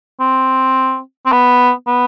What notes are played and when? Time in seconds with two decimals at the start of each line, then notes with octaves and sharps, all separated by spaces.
0.20 C4
1.26 C4
1.32 B3
1.87 B3